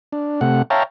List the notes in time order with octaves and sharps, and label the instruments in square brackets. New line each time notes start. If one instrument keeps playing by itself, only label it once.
[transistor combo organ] D4
C3 A3 F#5
C#5 E5 F5 G5 A5 A#5